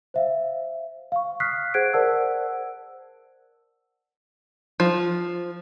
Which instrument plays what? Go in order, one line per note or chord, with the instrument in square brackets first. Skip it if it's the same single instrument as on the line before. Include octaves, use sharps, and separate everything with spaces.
[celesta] C5 E5 F5
F5 C#6
C#6 D#6 F6 F#6 B6 C7
G#4 C5 F#5 F#6 G#6 D7
A#4 C5 D5 F#5 A5 E6
[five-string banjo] F3